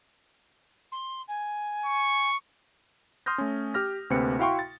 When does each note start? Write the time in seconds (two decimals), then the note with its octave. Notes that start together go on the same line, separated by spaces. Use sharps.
0.92 C6
1.28 G#5
1.86 C#6
3.26 C6 D#6 F6 G6 A#6
3.38 A3 C#4
3.74 G4 F6 A#6
4.10 D2 C3 A#3 C4 B4 C#7
4.39 E4 F#4 F5 G5 C6 C#6
4.59 A6